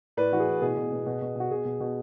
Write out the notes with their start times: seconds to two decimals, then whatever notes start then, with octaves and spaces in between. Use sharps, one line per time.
0.17 A2 B4 D5
0.32 E3 F#4
0.40 G#4
0.47 A2
0.62 B2 G#4
0.77 B2
0.92 B2
1.06 B2
1.22 B2
1.36 B2 F#4
1.51 B2 G#4
1.65 B2
1.80 B2